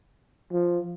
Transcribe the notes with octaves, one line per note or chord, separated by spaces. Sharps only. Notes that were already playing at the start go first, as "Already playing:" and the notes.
F3